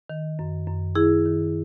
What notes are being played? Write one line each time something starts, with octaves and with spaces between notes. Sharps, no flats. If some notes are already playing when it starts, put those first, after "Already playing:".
D#3
F#2
F#2
D#3 E4 G#4
D#3